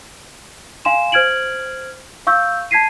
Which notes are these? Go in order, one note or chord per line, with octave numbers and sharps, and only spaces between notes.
F5 G#5 C6 E7
C5 F6 G#6 D7 F#7
F5 C#6 E6 G6
A5 G#6 B6 C7 D#7